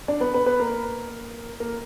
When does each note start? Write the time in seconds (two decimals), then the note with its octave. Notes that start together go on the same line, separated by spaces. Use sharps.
0.08 D4 D5
0.20 B3 B4
0.34 B3 B4
0.46 B3 B4
0.59 A#3 A#4
1.60 A#3 A#4